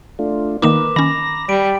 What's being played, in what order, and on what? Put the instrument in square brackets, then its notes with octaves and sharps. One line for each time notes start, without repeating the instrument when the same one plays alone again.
[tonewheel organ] A3 D4 F4
[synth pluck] D#3 A#3 D#4 [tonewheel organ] A#4 B4 [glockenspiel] D6 E7
[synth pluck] D#3 C#4 [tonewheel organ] A#5 A#6 [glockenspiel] B5
[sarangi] G3 [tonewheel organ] B5 [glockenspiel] D7